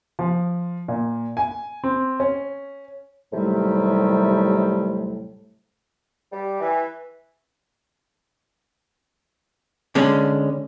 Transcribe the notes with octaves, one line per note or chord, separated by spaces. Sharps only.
F3
A#2
G#5
C4
C#4
D#2 A2 C3 F#3 G3 A3
G3
E3
D3 G#3 C#4